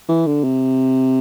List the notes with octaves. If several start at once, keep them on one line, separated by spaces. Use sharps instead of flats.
E3
D3
C3